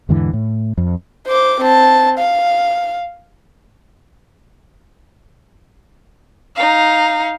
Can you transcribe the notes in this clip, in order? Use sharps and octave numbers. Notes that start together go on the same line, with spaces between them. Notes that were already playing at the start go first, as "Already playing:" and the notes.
E2 G#2 D3 E3
A2
F2
C5 D6
C4 A5
F5
D#4 F5